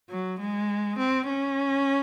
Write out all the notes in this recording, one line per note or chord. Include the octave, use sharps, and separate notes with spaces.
F#3
G#3
C4
C#4